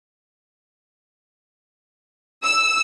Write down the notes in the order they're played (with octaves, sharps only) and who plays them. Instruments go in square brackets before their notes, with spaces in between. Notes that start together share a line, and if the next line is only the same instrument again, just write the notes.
[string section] E6